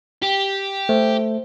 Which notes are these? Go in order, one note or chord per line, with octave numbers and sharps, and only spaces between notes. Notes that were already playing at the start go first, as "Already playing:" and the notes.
G4
A3 C5